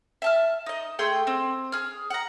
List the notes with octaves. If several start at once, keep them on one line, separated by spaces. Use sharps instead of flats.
E5 A5 F6
D#4 D#5
A3 G#4 G5 C6
C4
G#4 F6
F#5 A#5